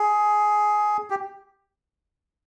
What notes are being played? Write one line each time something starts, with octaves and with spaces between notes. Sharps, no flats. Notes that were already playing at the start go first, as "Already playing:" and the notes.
Already playing: G#4
G4